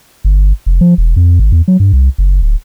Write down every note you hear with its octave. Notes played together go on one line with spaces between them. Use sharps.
G1
F1
F3
E1
F2
G#1
E2
F#3
G2
C2
F#1
D1